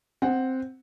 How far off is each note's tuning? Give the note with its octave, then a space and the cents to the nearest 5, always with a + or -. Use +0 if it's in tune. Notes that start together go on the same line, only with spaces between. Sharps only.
C4 +0 F#5 +0